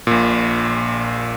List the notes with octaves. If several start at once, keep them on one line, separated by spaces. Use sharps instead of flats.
A#1 A#2